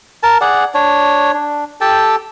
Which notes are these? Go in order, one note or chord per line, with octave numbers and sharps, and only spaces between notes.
A#4 A5
G#4 D5 F#5
D4 C#5
D4
G4 A4 G5 A5